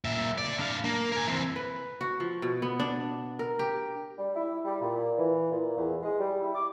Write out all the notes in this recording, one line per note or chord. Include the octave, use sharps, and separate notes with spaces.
A#2 E5
D3 D5
D4 F5
A#3
A#4 G#5
E3 C4
B4
F#4
F3
B2
B3
D4
A#4
G4
G3
E4
G3
A#2
E3
A#2
E2
G#3
G3
E4
D6